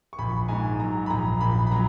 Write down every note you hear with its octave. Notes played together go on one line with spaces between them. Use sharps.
C#6
A#1 B5
G#2 G#5
F#3 A#5
B5
A#1 A#5
A#1 B5
B5
F#3 A#5